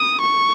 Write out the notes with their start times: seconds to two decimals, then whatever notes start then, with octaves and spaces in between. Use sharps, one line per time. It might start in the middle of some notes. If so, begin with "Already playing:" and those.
Already playing: D#6
0.21 C#6